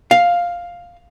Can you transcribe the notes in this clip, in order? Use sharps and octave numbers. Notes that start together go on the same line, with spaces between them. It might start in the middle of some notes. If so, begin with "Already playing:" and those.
F5